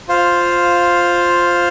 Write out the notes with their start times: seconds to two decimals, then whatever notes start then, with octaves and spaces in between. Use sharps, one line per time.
0.08 F4 C5 F5